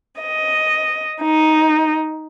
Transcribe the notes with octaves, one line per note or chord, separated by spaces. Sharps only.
D#5
D#4